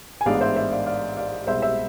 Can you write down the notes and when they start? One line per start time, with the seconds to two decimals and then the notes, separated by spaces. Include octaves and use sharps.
0.21 G#5
0.25 A1 G#2 G#3 B3 D4 D5 F5
0.41 C5 E5
0.56 C5 E5
0.72 D5 F5
0.86 D5 F5
1.17 D5 F5
1.47 C2 B2 G#3 C5 E5
1.62 C5 E5